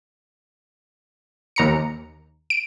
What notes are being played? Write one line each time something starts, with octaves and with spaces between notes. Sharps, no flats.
D#2 A#5 C#7
D7